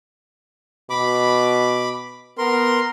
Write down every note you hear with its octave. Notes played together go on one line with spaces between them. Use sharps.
B2 B5 D6
B3 A#4 C6